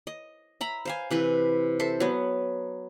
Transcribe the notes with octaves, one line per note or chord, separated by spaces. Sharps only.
D#5
E5 A#5 B5
C5 F5 G#5
C3 E3 B4
A4 C5 E5
F#3 B3